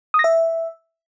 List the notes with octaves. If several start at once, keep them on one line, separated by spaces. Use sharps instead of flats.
D#6
A#6
E5